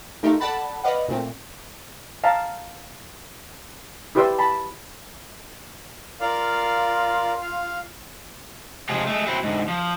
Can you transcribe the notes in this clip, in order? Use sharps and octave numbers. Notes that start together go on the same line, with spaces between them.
A3 D#4 F4 G4 A4 A#4
A4 D5 F#5 A5 B5
B4 D5 D#5 F5 F#5
A#2 A3 C4
F5 A5 A#5
E4 G4 B4 D5 C6 E6
A5 B5
F4 A#4 D5 F5
F5
C3 F3 G#3 F4
G#3 A3
F#3 C4 E4
G#2 D3
F3